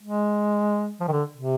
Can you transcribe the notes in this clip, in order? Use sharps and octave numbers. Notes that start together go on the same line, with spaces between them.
G#3
F3
D#3
D3
C3